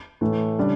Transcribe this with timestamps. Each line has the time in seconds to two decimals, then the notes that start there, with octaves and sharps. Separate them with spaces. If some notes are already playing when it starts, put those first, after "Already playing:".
0.21 A2 E3 A3
0.58 C#3 G3 D4